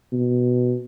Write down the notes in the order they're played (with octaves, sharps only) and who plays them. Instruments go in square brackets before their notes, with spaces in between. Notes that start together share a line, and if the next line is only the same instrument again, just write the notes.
[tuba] B2